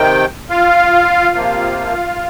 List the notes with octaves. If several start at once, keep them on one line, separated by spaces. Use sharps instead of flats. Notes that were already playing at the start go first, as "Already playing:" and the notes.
Already playing: C3 D#3 G5
F4 F5
C3 F3 A#3